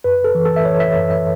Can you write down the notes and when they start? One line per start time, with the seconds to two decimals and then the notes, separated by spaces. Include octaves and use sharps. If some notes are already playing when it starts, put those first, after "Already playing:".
0.04 F#2 B4
0.24 A4
0.35 E3
0.45 A4
0.56 E5
0.65 E3 C#5
0.80 E5
0.96 F#2
1.11 E5